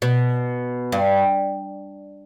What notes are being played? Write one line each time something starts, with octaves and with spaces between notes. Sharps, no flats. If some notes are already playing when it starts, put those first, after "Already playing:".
B2
G2